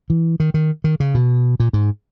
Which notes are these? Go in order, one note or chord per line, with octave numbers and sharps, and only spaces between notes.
E3
D#3
D#3
D#3
C#3
B2
A#2
G#2